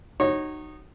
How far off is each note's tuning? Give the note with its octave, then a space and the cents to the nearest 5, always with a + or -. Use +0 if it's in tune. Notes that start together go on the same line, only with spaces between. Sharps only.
D#4 -20 F#4 +25 C#5 -25